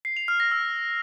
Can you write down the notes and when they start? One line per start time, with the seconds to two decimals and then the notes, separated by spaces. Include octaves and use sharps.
0.05 C7
0.17 F7
0.28 F6
0.40 A#6
0.51 E6